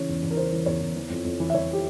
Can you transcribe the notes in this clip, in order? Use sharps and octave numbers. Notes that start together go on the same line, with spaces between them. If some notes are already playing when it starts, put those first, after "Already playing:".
Already playing: C#3 E3 C#5
E2
E2
A#4
C#3 C5
E3
E2 C#5
E2
E3
F2
F2
E3
E5
E3 C#5
G4